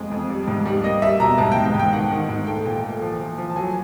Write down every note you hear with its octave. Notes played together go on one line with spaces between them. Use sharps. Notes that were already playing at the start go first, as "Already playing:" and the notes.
Already playing: F2 G#3
F2
G3
G#2
G3
A#3 D#5
G3 E5
B2 A#5
G#2 A5
G5
G#2
G5
G#2
G5
D#3 F#5
D#3
G#2
A3 G5
A#2
A3
F3
F3
F3
A5
F#3 G#5